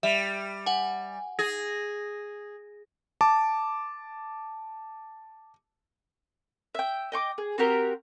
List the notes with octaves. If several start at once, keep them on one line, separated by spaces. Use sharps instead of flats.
G3 E5
F#5 G#5
G#4 A#6
A5 D6
E5 G5
D#5 G5 C#6 D6
G#4
C4 F#4 G4 A#4